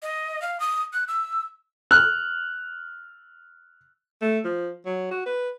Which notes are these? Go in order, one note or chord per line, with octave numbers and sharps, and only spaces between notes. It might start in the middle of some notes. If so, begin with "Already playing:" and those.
D#5
F5
D#6
F#6
E6
F6 F#6
A3
F3
F#3
F#4
B4